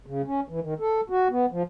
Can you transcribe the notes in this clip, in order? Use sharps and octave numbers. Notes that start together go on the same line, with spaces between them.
C#3
C#4
E3
D#3
A4
F#4
B3
F3